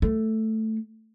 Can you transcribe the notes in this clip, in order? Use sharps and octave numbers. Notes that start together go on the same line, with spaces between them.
A3